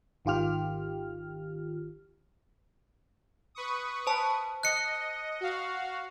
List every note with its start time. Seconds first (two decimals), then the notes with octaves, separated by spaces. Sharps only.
0.25 G#1 D#3 F4 G4 F6
3.55 B4 C#6 D#6
4.07 C5 A5
4.63 D#5 F#6 C#7
5.41 F#4 F5